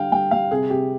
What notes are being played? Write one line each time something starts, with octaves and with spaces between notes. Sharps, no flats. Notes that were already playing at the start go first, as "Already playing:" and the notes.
Already playing: D3 G3 F5 G5
G3 G5
G3 F5
C3 G#4
C3 G4